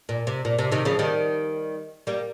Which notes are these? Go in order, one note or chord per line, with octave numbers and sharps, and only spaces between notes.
A#2
C3
A#2
C3
C3 D#3
C#3 F3
D#3 G3
G3 A#3